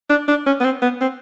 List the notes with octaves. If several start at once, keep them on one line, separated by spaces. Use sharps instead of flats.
D4
D4
C#4
B3
C4
B3
C4